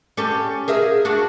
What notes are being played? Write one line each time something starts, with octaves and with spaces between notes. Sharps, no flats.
C#4 G4 A4
G#4 A#4 E5
D4 F#4